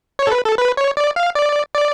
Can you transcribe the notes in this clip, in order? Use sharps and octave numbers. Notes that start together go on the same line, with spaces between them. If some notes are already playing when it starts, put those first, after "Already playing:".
C#5
A4
B4
A4
B4
C#5
D5
F5
D5
D5